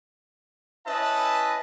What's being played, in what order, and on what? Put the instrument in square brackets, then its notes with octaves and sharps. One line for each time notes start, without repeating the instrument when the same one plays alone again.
[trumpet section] C#4 E4 B4 D#5 E5 A5